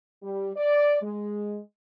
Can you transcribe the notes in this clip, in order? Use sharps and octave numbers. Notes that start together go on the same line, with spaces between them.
G3
D5
G#3